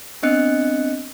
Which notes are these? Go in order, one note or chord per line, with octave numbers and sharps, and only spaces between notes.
B3 C4 D4 D#5 F#6 C#7